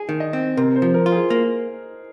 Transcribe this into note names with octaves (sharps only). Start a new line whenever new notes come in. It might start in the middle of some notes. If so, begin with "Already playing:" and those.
Already playing: G#4 G#5
D#3
D#5
C4
C3 A#4
C5
F3
A#4
F4
G#4
A#3